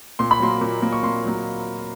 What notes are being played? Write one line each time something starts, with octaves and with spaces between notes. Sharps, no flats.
A#2 C6
B5
F#3 A#3 C6
A#2
F#3 A#3
C#6
A#2 C6
F#3 A#3